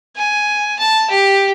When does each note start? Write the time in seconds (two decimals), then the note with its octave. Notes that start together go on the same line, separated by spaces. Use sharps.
0.17 G#5
0.79 A5
1.10 G4